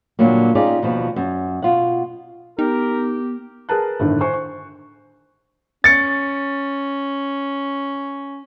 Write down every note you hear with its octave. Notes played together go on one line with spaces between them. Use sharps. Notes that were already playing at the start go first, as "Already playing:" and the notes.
A#2 D3 F#3 G3 A#3
C#4 D#4 F4 G4 G#4 D5
D#2 B2 F3
F#2
B2 F4 F#5
B3 D#4 G4 A#4
G#4 A#4 B4 A5 F#6
G1 A2 D3 D#3
C5 G#5 C6 C#6
C#6
C#4 A6 C#7